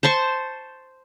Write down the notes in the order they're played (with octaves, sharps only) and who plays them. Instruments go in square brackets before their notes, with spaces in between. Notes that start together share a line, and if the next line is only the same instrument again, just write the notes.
[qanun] C5 A5 C6 C#6